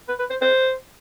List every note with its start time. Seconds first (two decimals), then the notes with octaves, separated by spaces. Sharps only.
0.08 B4
0.19 B4
0.30 C5
0.41 C5